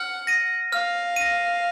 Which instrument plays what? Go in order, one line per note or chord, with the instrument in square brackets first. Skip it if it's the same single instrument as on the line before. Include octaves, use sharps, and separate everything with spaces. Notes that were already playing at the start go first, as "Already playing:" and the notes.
Already playing: [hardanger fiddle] F#5 [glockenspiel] F6
[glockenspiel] A#6 D#7
[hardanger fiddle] F5 [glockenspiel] F6
[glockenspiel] A#6 D#7